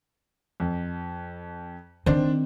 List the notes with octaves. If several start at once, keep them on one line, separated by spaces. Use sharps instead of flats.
F2
D#3 C4 D4 C5